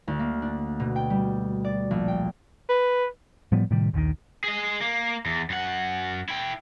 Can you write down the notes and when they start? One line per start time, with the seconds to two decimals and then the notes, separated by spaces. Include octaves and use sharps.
0.08 D2
0.20 A#3
0.42 D4
0.80 B2
0.96 G5
1.10 G3
1.64 D5
1.91 A#1
2.08 G5
2.69 B4
3.52 A2 F3 G3 B3
3.71 A2 C3 D#3 G3
3.93 A#1 D#2 D3 D#3
4.44 G#4 D#5
4.81 A#3
5.26 E2
5.50 F#2 F#5
6.29 E4 G5